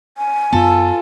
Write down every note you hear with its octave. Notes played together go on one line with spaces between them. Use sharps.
G#5
F#2 B3 F4 A4